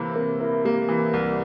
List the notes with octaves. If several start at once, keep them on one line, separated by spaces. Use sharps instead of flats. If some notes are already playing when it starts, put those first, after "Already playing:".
Already playing: C3 E3 A#3 E4
C3 A#4
E4 A#4
A#3 G4
E3
C2